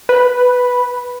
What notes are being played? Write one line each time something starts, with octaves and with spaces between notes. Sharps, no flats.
B4